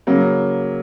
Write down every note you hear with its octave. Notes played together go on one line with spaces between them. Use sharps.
C#3 F#3 A#3